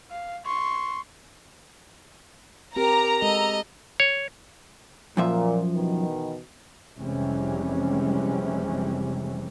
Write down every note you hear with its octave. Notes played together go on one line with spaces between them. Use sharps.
F5
C6 C#6
C4 G4 A#4 A#5
G#3 A4 D#5
C#5
F#2 A#2 F3 E5
B2 D#3 E3
F1 C3 E3 G3 G#3 C#4